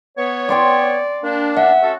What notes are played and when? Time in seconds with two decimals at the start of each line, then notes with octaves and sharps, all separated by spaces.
0.17 B3 C#5
0.49 D5 G5 C6 D6
1.23 A#3 D4
1.57 E5 F#5
1.82 C#4 F#4 A4